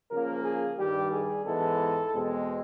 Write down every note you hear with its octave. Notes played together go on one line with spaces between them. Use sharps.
C#3 F3 A#3 A#4
G#4
G2 D#3 G3 G4
G#4
G#2 E3 G#3 B3 A4
E2 B2 G#3 C4